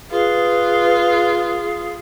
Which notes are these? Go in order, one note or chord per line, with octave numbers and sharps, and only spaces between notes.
F4 G#4 B4